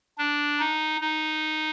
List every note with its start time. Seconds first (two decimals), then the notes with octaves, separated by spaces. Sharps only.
0.18 D4
0.59 D#4
1.01 D#4